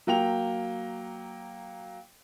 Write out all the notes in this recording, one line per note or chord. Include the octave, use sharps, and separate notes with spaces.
F#3 A#3 G5 F7